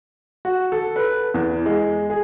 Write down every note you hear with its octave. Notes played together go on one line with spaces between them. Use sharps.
F#4
A4
B4
E2
G#3
G#4